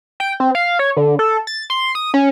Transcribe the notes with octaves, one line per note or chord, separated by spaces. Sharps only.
G5
C4
F5
C#5
D3
A4
A6
C6
D#6
C#4